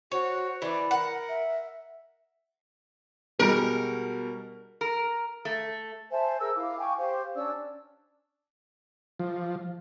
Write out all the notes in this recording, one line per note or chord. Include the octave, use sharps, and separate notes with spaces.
F#4 C5 C#5
E3 D5 B5
A#4 F#5
E5
B2 G3 G#3 A#4
A#4
A3
C5 E5 G#5 A5
G#4 A#4 E6
E4 F5 D6
G5 G#5 C#6 D6
G4 C5 F5
C#4 D4 D5 E6
F3